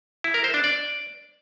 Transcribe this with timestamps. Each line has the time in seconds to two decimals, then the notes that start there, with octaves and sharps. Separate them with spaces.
0.24 E4
0.34 A#4
0.44 C5
0.54 D4
0.64 D5